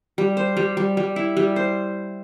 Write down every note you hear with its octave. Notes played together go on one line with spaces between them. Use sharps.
G3
C5
G3
G3
G3
E4
G3
C5